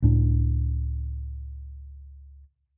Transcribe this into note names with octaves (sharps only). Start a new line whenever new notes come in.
C#2 A2 D4